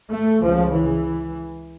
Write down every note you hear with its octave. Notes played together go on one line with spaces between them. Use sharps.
A3
C#2 C#3 F3
E3